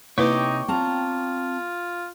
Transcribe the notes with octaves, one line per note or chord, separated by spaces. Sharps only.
C3 A#3 D#4 E4 B4 C#5 G5 D6
C4 F4 A5 A#5